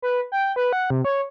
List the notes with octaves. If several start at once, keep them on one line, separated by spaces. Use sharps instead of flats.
B4
G5
B4
F#5
C3
C#5